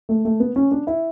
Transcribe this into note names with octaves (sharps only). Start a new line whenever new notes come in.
A3
A3
B3
C#4
D4
E4